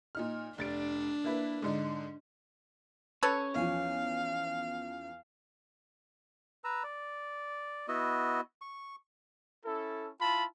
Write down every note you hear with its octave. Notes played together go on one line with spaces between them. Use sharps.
A#2 D#4 F6
F1 D4 A6 D7
A#3 E4 B4
G#2 D3 D#4
C#4 A4 B4 C#5
E2 F3 F5
B4 A#5 E6
D5
B3 E4 F#4 D#5
C#6
C#4 E4 A4
E4 F4 A5 B5